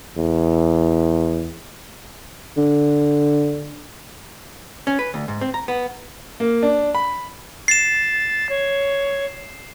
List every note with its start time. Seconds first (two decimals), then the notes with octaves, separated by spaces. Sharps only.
0.17 E2
2.57 D3
4.87 C#4
4.99 B4
5.14 D2
5.28 G#2
5.41 C4
5.54 A#5
5.68 B3
6.40 A#3
6.63 D4
6.95 B5
7.68 A6 C7 E7
8.49 C#5